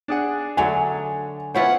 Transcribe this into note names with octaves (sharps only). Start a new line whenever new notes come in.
D4 G#4 F#5
D3 F#3 A3 G#5
B3 C#4 E4 F4 C5 C#5 F#5